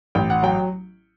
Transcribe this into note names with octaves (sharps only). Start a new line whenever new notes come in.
A1 G5
F#5
F#3 G5